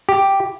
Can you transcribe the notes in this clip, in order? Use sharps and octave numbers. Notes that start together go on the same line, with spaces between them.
G4